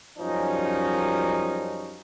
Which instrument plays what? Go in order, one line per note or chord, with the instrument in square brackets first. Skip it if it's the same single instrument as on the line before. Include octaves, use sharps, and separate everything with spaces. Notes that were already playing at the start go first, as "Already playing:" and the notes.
[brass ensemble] F#2 F3 G3 C#4 D#4